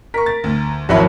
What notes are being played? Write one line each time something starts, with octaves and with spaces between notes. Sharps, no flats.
A#4 C#6 B6
A6
D2
G#1 F3 F#3 E4 F#4 E5 B5